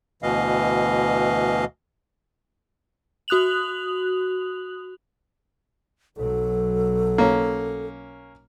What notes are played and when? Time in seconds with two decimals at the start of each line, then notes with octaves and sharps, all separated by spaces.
0.22 D2 B2 E3 D#5 F5
3.28 F#4 D#6 F#6 F7 F#7
6.17 B1 F#3 A4
7.18 A#3 C#4